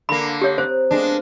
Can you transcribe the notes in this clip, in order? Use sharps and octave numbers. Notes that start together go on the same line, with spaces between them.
D3 A#3 B5 C7
A#5
G4 C#5 D#6
C4 C5
G#3 A#3 B3 D4
F6 F#6